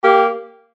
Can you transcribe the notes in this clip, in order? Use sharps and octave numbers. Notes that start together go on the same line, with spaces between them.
A#3 G4